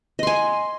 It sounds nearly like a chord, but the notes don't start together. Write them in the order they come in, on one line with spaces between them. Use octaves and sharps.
D#5 C6 G#5